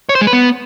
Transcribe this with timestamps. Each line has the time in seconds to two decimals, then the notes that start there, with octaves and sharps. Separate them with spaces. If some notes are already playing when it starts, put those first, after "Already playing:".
0.09 C#5
0.15 C5
0.21 G#3
0.27 B4
0.33 B3